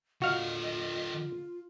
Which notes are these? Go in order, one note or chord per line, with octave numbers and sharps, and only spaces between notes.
D3 F4 F#4 D#5 F5